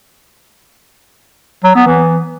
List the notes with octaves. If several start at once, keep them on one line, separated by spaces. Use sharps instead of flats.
F#3
B3
E3